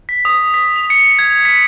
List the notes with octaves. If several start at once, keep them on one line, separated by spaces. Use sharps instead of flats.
B6
D#6
B6
F7
C#7
G#6
B6